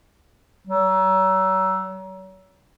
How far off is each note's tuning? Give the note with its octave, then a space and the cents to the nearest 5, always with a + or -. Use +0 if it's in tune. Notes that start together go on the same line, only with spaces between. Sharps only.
F#3 +35